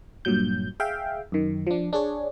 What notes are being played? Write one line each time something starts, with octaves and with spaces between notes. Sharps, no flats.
G2 A#2 F#3 G6
G#4 E5 F5 G5
F#2 D#3
F3 D4
D4 G#4 C#5